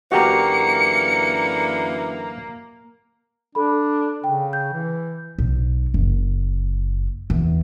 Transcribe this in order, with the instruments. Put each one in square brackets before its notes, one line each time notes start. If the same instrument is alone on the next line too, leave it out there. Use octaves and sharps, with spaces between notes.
[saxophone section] F#2 D3 E3 [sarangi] A#3 [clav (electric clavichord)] F#4 G4 A#4 [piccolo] C#7
[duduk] D4 [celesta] A4 B5
[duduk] C#3 [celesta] G5
[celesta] G6
[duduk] E3
[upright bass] B1
F#1
E2